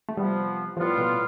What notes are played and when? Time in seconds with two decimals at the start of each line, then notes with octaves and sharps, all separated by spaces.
0.09 A3
0.17 C3 F3 G3 B3
0.77 A2 F3 G3 B3 F4
0.98 B2